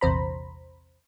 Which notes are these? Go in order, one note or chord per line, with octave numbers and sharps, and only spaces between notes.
A#1 E2 C3 C5 A#5 B5